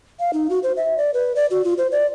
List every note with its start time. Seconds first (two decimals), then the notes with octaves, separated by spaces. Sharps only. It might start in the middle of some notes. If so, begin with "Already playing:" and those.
0.20 F5
0.33 D#4
0.50 F#4
0.63 C5
0.77 E5
0.98 D5
1.14 B4
1.36 D5
1.51 F#4
1.64 F4
1.78 C5
1.92 D5